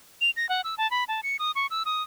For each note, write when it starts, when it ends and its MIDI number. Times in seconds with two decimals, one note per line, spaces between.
0.21 0.30 101
0.36 0.49 94
0.49 0.61 78
0.64 0.75 88
0.78 0.89 81
0.91 1.04 83
1.08 1.21 81
1.23 1.37 97
1.39 1.51 87
1.55 1.67 85
1.70 1.83 88
1.85 2.03 87